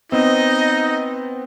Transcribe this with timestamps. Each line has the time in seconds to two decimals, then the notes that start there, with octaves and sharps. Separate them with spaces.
0.12 B3 C4 D#4 D#5